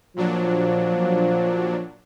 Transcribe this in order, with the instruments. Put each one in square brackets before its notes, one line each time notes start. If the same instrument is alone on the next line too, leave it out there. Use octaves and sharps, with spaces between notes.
[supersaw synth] A#2 F#3 D4 [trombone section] F3